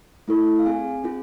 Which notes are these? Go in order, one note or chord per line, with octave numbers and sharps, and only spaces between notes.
A3 E4 A4
F5
C4 G#4 G#5
C4 F4 G#4